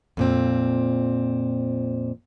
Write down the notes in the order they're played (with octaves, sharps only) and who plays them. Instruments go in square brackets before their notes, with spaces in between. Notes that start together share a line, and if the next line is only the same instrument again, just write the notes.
[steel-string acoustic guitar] F2 A#2 C4